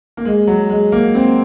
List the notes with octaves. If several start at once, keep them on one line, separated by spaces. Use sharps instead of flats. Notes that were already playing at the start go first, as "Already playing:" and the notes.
A#3
G#3
F#3
G#3
A#3
C4